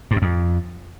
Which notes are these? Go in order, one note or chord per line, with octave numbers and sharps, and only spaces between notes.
G2
F#2
F2